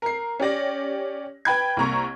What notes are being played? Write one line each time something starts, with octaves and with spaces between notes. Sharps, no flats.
A#4 C7
C#4 G4 D5 A#6
B4 G5 B5 G#6
C2 A#3 A#5 C#6